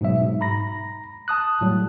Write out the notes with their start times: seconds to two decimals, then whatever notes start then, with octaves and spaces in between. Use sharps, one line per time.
0.01 G#2 B2 F#3 E5
0.21 G#2
0.41 A#5 B5 A#6
1.28 A5 D#6 F#6
1.61 A2 F#3 G3